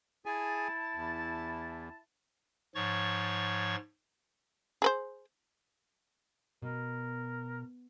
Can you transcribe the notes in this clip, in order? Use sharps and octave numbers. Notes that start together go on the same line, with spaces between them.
E4 G#4 G#5 A5
E2
G#2 F3 C#5 C#6 A6
G#4 B4 C5
B2 A#4